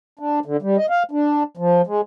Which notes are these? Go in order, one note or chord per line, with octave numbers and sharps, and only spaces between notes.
D4
D3
G3
D#5
F5
D4
F3
G#3